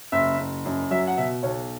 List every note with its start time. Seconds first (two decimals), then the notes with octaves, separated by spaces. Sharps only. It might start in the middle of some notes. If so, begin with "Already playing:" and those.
0.12 F#1 E5
0.38 F#1
0.65 F#2
0.91 F#3 E5
1.07 F#5
1.17 B2 E5
1.43 B1 C#5